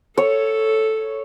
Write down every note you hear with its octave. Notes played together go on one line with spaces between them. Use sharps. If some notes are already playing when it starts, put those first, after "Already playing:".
A4 C#5